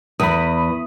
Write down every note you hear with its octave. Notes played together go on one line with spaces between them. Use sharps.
E2 B5 D#6